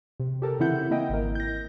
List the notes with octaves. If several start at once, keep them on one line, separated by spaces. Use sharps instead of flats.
C3
G4 A4 A#4
C#3 E3 C4 E4 F#5 G6
A#3 E4 D#5 G5
G#1 A#4
G6 A#6